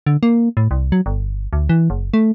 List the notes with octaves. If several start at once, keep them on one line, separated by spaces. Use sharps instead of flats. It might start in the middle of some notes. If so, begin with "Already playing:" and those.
D3
A#3
A2
C2
F#3
G1
D2
E3
F#1
A3